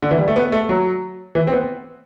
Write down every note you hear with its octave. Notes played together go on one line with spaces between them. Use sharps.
D3
E3
G3
A3
B3
A3
F#3
E3
C4
B3